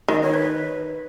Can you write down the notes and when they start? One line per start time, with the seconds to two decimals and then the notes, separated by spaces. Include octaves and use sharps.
0.08 D#3 D#5
0.23 C#5
0.34 B4